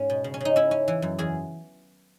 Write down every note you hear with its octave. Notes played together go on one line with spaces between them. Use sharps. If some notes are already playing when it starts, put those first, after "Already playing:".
Already playing: G#2 C#4
B2
C#3
C#4
C#3 D#4
C#4 E4
C#4
E3
F#2
E2 G#4